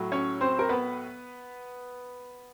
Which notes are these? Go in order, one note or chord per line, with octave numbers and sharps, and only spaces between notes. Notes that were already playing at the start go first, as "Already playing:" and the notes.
Already playing: A2 F#3
C#4 C#5
C4 C5
A#4
B3 B4